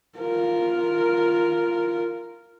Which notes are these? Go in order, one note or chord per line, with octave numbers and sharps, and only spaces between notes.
F4 A#4